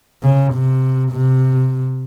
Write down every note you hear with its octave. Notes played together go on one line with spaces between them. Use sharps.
C#3
C3
C3